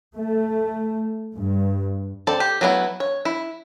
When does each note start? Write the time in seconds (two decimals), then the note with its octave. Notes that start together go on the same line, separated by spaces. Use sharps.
0.16 A3
1.37 G2
2.27 C4 A4 D5 A5
2.40 G4
2.61 F#3 A3 B3 D4 E4
3.00 C#5
3.25 E4